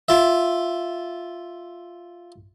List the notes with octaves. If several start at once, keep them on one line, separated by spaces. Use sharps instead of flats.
F4 E5